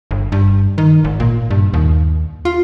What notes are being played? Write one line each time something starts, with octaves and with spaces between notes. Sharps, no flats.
G1
G2
D#3
G#1
A#2
G2
D#2
F4